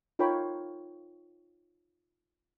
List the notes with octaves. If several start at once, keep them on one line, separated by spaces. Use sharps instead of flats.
D#4 F4 A#4 C#5 G5 B5